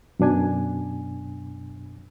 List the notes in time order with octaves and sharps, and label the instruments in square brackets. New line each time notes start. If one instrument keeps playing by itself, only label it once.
[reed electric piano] F#2 B2 D4 G#5